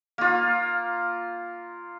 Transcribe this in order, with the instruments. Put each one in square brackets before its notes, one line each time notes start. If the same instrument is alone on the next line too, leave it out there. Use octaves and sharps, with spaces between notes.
[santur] A#3 F4